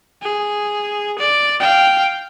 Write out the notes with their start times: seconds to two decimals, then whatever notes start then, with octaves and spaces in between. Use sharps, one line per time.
0.22 G#4
1.19 D5
1.60 F5 G5